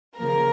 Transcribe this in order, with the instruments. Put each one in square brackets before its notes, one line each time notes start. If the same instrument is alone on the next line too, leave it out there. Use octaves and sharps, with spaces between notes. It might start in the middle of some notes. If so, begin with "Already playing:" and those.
[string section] C#3 F3 A#3 A#4 A#5